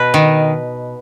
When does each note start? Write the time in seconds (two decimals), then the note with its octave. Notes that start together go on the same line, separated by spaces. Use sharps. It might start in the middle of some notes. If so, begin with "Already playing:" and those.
Already playing: B2 B4
0.14 D#3